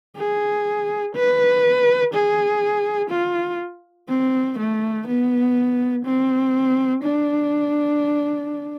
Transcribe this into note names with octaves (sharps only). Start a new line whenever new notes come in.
G#4
B4
G#4
F4
C4
A3
B3
C4
D4